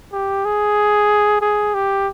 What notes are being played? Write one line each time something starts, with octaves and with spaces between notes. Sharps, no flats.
G4
G#4
G#4
G4